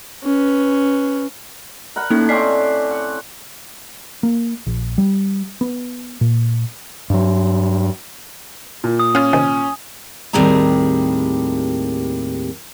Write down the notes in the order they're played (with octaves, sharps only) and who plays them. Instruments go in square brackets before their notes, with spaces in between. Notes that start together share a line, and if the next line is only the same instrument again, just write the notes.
[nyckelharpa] C#4 B4
[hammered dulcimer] A#4 F#5 B5
[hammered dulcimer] A2 [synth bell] A#3 C#4 D#4
[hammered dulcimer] C4 C#4 D5 [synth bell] D#5 B6 C7
[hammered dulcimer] F#5
[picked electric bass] A#3
A#1
G3
B3
A#2
[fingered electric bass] G2 F#3
[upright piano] A#2
[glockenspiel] D#6
[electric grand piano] C#4 [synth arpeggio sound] F4 F5
[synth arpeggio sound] C3 D#3 [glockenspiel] G#5
[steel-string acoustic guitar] D#2 A2 G3 C4 G#4 A#5